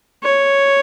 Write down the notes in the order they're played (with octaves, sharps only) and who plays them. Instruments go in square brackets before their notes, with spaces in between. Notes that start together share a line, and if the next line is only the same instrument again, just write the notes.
[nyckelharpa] C#5